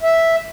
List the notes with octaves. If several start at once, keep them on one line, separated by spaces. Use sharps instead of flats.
E5